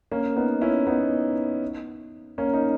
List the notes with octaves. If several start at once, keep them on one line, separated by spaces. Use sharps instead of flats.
A#3 C#4
B3 D#4
C#4 E4
B3 D#4
A#3 C#4
D#4